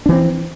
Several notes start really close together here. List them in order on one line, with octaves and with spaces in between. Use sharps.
D4 E3 C4